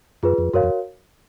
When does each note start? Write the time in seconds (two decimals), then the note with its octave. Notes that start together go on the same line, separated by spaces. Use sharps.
0.23 F#2 F4 G#4 B4
0.38 F2
0.53 F#2 F#4 A#4 C#5 F5
0.63 F2